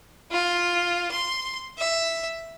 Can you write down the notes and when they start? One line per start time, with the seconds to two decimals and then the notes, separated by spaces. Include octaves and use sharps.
0.31 F4
1.12 C6
1.78 E5